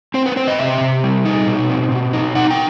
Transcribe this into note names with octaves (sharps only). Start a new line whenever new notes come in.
C4 C5
B4
C4 C5
D#5
C3 E5
C3
G3
D#4
B2
C4
B2
D#4
D#4 F#5
G5